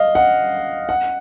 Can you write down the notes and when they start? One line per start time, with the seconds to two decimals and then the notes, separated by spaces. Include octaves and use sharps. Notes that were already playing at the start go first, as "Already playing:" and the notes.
Already playing: D#5 F5
0.15 F#5
0.89 F#5